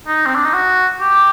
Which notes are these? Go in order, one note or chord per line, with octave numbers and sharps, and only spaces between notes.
D#4
C4
D4
D#4
F#4
G4